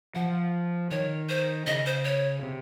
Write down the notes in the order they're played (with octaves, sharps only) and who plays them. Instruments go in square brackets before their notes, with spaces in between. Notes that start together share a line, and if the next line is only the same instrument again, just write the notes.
[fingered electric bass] F3 [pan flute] F#5
[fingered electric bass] D#3 [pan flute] C#5
[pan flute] C5
[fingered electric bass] C#3 [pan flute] D#5
[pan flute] C5
C#5
[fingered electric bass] C3